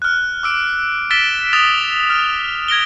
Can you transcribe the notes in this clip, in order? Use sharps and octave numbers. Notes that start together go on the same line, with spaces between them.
F6 F#6
D6 E6 D7
E6 A6 B6 D7 E7 G7
D#6 E6 A6 F7
F6
G#6 A#6 D7 G7